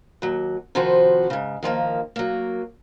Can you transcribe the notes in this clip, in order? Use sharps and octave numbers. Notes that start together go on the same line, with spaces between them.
D#2 F#3
C3 D#3 F3 F#4 B4 C5
G#2 C#3
D#3 F3 G3 A#3
F#3 A#3